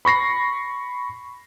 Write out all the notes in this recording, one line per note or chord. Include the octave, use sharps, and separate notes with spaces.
B5 C#6 A#6 C7